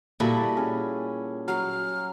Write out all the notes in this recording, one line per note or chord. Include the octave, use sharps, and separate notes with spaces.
A#2 G3 E4 F#4 A4
C#4 G#4
F#3 F6